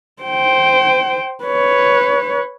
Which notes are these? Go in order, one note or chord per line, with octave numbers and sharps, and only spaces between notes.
C5 G5
B4 C#5